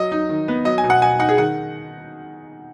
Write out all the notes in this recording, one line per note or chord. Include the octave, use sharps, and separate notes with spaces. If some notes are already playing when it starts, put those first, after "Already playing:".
Already playing: F#3 D#5
D#4
D#3
B3
F#3 D#5
G#5
B2
F#5
B2 G#5
D#4 F#5
G#4
D#3 F#5